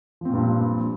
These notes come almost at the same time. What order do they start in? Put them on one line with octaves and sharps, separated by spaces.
F3 C4 A#2 G2